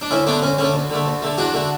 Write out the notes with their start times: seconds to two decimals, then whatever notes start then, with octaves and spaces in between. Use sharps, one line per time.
0.01 D4
0.11 D2 C#4 E4
0.27 D3 A3 B3 D4
0.42 D2 C#4
0.59 D3 A3 C#4
0.74 D2
0.90 D3 A3
1.06 D2
1.22 D3 A3
1.38 E2 D4 F#4
1.54 D3 A3